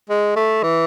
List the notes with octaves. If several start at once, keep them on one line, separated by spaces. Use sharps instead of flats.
G#3
A3
E3